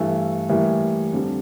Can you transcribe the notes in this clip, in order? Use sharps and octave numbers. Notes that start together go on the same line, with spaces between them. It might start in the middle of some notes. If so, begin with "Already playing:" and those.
Already playing: G2 E3 A3
A2 E3 G3 A#3
F2 D3 G3